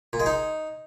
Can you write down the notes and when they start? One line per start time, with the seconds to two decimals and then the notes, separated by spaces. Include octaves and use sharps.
0.13 A#2
0.20 G#3
0.26 D#4